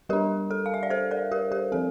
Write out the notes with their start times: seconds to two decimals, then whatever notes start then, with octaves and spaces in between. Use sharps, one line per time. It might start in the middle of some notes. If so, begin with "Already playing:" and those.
0.09 G3 D4 G4 A#4
0.51 A4
0.66 F5
0.74 E5
0.83 D5
0.90 A4 C5
1.11 A#4 D5
1.31 G4 A#4
1.52 G4 A#4
1.72 F3 C4 A4